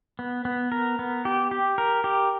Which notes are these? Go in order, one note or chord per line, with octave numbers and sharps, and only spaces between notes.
B3
B3
A#4
B3
G4
G4
A#4
G4